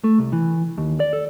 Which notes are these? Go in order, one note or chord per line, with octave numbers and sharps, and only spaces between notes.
A3
C2
E3
D#2
D5
A4